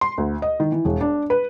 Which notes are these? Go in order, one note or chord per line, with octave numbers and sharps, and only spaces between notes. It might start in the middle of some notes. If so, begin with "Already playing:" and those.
C6
D2
D#5
D#3
E3
E1
D4
B4